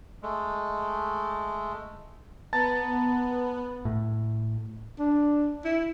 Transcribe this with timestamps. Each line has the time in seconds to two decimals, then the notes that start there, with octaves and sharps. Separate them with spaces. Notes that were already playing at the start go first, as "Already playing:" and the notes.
0.23 G#3 A3
2.53 B3 A5 A#5 A6
3.85 A2
4.99 D4
5.65 E4